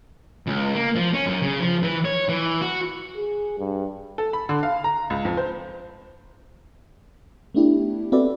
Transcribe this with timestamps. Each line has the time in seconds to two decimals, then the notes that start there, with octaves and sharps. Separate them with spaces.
0.47 C#2
0.75 A#3
0.96 F3
1.14 C#4
1.26 F#2
1.42 C#3
1.60 F3
1.83 E3
2.05 C#5
2.29 E3
2.61 F#4
3.16 G#4
3.58 G2
4.18 A4
4.33 B5
4.49 D3
4.63 F5
4.84 A#5
5.10 C#2
5.25 F2
5.37 C5
7.55 A3 B3 D4 E4 G4
8.12 C4 F#4 A4 B4 D5 E5